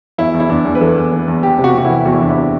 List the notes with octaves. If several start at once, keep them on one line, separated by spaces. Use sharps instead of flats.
E2 E4
E2
E4
E2 D4
E2
B4
E3 A4
E2
E3
E2
E2 G4
C3
F#4
C3 F#4
E4
E3
E2 F#4
E4
E2 D4
E4
C3